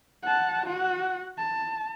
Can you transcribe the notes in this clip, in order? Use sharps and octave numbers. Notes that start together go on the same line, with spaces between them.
F#5 A5
F#4 F#5
A5